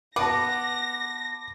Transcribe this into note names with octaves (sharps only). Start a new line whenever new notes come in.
B3 A5 D6 A#6